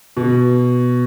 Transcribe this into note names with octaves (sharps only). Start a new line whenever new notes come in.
B2